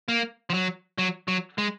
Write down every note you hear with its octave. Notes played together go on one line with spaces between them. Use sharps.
A#3
F3
F#3
F#3
F#3
G#3